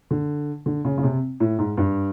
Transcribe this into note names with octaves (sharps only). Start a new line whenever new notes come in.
D3
D3
C#3
C#3
C3
A2
G#2
G2